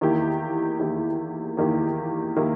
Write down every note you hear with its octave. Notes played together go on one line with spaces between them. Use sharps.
E2 D#3 A#3 E4 G4
E2 D#3 A#3 E4 G4
E2 D#3 A#3 E4 G4
D#3 A#3 E4 G4